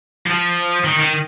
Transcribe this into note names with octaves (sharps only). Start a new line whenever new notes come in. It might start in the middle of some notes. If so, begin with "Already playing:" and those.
F3
D#3
D#3